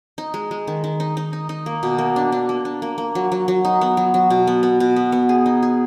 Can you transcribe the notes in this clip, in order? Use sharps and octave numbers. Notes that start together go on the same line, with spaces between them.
D#4
G#3
G#3
D#3
D#3
D#4
D#4
D#4
D#4
A#3
B2
A#3
D4
D4
A#3
D4
A#3
A#3
F#3
F#3
F#3
D#4
B3
F#3
F#3
B2
B3
B3
B2
B3
B3
G#4
D#4
G#4